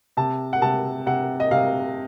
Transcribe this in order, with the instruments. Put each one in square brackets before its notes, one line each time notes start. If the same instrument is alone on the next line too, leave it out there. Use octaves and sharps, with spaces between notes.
[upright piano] C3 A5
F#5
C3 A5
C3 F#5
D#5
C3 F5